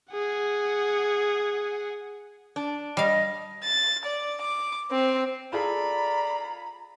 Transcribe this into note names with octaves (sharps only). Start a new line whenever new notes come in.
G#4 F#5
D4
G3 D#5 F5
A6
D5
D6
C4
F4 G#4 A4 D5 A#5 B5